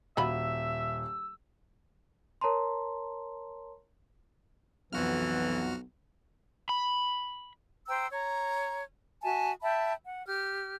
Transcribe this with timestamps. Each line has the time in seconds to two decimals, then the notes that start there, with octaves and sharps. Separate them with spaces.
0.17 D#1 F#3 F4 E5 B5 E6
2.41 A#4 C#5 A5 A#5 C6
4.93 B1 F2 E3 F#4 F6
6.69 B5
7.88 C5 G5 A#5 E6
8.12 C#5 A#5
9.23 F#4 E5 G#5 A5
9.63 E5 G5 A5 B5
10.05 F#5
10.26 G4 F6